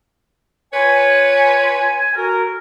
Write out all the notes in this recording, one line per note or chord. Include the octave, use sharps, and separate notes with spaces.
F4 B4 C#5 G#5
F#4 A4 A#4